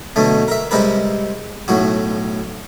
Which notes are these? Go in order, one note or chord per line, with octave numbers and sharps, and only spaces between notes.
B2 D3 F#3 A3
A#4 E5
C3 G3 G#3 C4 A#4 B4
B1 A2 F#3 F#4